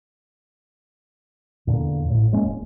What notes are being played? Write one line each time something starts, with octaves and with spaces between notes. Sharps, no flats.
E2 A#2 D3
A1 A2
E1 G#3 A#3 C#4
E1